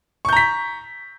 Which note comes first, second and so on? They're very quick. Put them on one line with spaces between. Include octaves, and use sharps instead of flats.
C#6 G6 A#5 B6